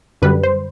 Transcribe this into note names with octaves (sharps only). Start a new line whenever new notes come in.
F#2 D3 G3 B4
C5